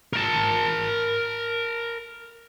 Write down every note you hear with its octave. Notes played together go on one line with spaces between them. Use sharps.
A#4 A5